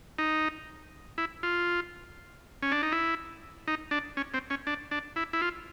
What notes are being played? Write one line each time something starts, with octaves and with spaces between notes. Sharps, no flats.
D#4
E4
F4
C#4
D4
D#4
E4
D#4
D4
C#4
C4
C#4
D4
D4
E4
E4
F4